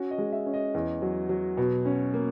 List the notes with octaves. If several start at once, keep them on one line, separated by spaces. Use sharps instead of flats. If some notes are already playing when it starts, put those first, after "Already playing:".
Already playing: C#4 F#4
D#5
G#3
E5
C#4
D#5
E2
F#3
F#3
B2
C#4
A#3